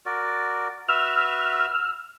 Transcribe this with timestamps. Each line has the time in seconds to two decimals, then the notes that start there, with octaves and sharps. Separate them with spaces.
0.06 F#4 A#4 D5
0.89 F#4 B4 E5 E6 F6